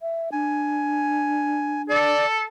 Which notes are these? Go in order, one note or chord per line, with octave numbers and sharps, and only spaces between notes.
E5
D4 G#5
A4 D5